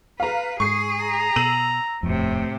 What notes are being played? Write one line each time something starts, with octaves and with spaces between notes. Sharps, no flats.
B4 F5 A#5
G#2 G#4 C#6 C7
A#5
B2 E6 D#7 F#7
D#1 F2 A2 C3